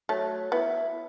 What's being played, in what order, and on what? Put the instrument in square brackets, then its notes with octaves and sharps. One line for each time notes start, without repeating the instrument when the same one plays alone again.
[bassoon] F#3 [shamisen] A3
[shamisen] B3 [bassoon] E4